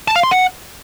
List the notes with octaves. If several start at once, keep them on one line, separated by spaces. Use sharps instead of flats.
A5
F5
C6
F#5